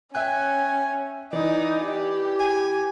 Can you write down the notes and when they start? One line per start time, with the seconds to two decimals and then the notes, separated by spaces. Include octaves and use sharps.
0.15 C#4 E5 G5 G#5 F#6
1.33 E3 D#4 D5
1.85 G4
2.40 G#5